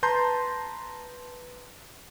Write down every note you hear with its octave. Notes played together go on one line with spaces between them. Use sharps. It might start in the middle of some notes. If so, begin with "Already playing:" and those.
B4 A5 A#5 C6 G6